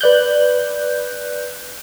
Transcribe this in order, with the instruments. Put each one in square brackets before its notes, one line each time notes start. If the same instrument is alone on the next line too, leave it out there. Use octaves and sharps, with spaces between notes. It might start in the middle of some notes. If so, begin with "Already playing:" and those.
[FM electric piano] B4 D5 F#6 G6